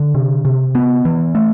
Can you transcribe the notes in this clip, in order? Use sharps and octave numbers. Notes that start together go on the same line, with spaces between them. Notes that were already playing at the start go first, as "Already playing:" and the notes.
Already playing: D3
C3
C3
B3
E3
A3